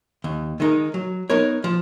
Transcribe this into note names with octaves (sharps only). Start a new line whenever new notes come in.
D#2
D#3 G#3 D#4 A#4
F#3
B3 D#4 A#4 C#5
F3